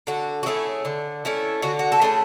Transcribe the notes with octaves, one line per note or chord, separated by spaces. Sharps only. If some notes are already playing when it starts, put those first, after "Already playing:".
D3 F#4
F#4
A3 C#4 E4 G#4
D3
A3 C#4 E4
D3 F#4
F#4
A4
A3 C#4 E4 G#4